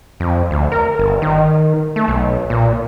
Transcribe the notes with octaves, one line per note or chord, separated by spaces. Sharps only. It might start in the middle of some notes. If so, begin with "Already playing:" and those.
F2
D2
A#4
G1
D#3
A3
B1
A#2